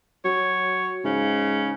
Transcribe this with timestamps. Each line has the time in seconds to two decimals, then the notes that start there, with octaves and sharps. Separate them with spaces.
0.25 F#3 C#5
1.04 G#2 C#3